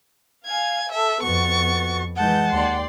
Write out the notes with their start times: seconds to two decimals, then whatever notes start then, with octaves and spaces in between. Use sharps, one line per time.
0.46 F5 G#5 G#6
0.91 A4 E5
1.23 F2 B3 F#4 C#6 A6
2.17 E3 G#3 F#5 A5 G6
2.52 D#2 D5 G5 C6